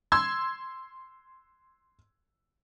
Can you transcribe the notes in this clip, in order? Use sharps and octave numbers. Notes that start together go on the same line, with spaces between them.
C6 E6 G#6